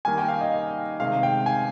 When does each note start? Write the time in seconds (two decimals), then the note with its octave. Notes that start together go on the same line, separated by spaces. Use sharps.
0.05 D#3 G3 A#3 D#4 G#5
0.18 G5
0.28 F5
0.41 D#5
1.00 C3 D#3 G#3 F5
1.23 G5
1.46 G#5